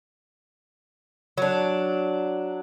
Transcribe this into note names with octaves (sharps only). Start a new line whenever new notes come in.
F#3 D4